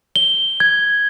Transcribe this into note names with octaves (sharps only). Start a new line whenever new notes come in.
G7
G#6